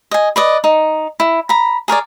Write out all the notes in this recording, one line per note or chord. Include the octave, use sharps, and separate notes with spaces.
D#5 G#5
B4 D5 D#5
D#4
E4
A#5 B5
G#4 A#4 C#5 D5